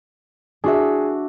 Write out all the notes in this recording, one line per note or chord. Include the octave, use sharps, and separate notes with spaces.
D4 F#4 G#4 E5